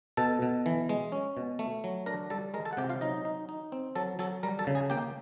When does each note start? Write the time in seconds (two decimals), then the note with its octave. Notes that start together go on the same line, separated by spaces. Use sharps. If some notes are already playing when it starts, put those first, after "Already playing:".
0.17 B2 A4 A5
0.42 B2
0.66 E3
0.89 G#3
1.12 C#4
1.37 B2
1.59 A3
1.84 F#3
2.06 D4 A#4 A#5
2.30 G3 A4 A5
2.54 G#3 A#4 A#5
2.65 A4 A5
2.73 F#5
2.77 C3 G4 G5
2.89 F4 F5
3.01 F#3 D#4 D#5
3.25 D#4
3.49 D#4
3.72 C4
3.95 F#3 A4 A5
4.19 F#3 A4 A5
4.43 G3 A#4 A#5
4.59 A4 A5
4.67 C#3
4.75 G#4 G#5
4.90 A#3 G4 G5